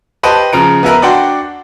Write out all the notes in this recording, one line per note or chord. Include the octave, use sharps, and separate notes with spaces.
G4 B4 C5 D#5 G5 A5
C#3 F3 A#5 D7
B3 E4 A#4 B4
D4 F#4 D5 F#5 G5 C6